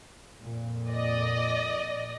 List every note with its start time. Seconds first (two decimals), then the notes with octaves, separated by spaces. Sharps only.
0.42 F2 A#2
0.91 D5 D#5